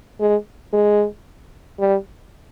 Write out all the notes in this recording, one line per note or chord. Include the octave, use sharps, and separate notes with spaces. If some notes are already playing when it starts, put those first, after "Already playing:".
G#3
G#3
G3